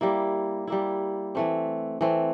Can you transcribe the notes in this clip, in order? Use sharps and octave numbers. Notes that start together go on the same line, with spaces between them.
G3 A#3 E4
G3 A#3 E4
E3 A3 C4
E3 A3 C4